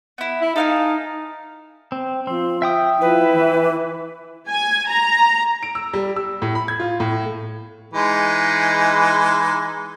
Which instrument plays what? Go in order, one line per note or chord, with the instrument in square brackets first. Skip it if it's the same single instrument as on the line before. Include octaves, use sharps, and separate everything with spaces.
[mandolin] B3 E4
[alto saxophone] E4
[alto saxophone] D#4 [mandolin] A4 F5 G#5
[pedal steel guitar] C4
[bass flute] F3 [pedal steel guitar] C4
[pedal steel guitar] E5 G5 D#6
[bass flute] F3 [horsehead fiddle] E4 [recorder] B4
[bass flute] E3
[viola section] G#5
A#5
[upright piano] D7
E6
G3
E6
A2
B5
G#6
F4
A2
A3
[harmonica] E3 G#3 D#4